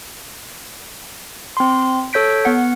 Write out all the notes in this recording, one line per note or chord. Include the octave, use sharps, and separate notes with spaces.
C4 C6
A4 C#5 G6 B6 D7
B3 F#5